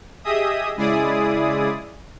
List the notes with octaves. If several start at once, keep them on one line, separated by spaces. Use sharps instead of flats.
G4 G#4 D#5 E5 D#6
C#3 G#3 E4 G#4 D5 D#6